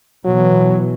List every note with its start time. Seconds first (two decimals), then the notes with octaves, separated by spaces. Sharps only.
0.24 B2 E3 F#3